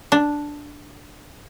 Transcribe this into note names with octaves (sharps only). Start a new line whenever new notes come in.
D4